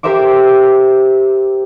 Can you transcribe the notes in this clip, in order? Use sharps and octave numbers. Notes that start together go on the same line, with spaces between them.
G4 A#4 C5 E5 D6